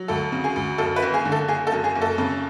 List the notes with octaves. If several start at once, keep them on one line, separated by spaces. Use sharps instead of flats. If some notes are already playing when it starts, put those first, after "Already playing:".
Already playing: F#3
D2 A4
C#3
G#4
D2
F#2 A4
B4
F#1
G#4
D3
A4
F#1 G#4
A4
F#2
G#4
F#1
A4
C#3